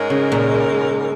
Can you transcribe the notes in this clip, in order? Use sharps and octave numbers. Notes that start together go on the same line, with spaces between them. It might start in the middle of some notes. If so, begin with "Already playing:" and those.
Already playing: G#2 G#3 C#4 A#4
C#3
A#2